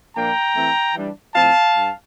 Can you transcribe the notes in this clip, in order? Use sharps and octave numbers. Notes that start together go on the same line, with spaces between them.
A#2 F3 A#3 D4 G5 A#5
E3 A3 C4
E3 G3 D4
A2 F3 C4 F5 A5
G2